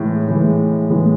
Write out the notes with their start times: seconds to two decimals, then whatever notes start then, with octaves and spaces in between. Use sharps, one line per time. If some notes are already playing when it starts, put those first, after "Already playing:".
Already playing: A2 E3 G#3
0.29 A2 E3 G#3
0.90 A2 E3 G#3